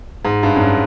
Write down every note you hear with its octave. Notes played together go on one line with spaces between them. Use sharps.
G#2
G2
F#2
G2